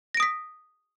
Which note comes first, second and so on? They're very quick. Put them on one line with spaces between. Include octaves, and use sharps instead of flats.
A#6 D7 D#6 B6